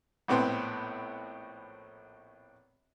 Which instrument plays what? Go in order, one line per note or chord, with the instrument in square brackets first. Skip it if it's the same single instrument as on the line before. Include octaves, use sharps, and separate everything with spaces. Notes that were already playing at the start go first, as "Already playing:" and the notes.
[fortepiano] A#1 A2 B3 C4 C6